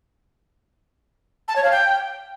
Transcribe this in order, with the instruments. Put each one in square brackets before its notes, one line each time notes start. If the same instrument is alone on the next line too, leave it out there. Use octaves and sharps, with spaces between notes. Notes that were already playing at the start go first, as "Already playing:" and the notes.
[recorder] A5
C#5
F5
G5